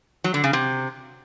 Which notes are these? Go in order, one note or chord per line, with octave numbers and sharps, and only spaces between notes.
F#3
D3
C#3
C3